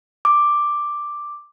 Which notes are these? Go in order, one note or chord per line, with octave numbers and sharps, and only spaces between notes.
D6